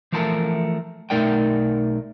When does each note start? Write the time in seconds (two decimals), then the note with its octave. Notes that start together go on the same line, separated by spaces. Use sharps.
0.12 E3 F3 A3 A#4 A5
1.10 B1 A3 D#4 A#4 D5 G5